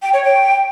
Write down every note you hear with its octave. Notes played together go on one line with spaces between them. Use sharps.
G5
C#5
G5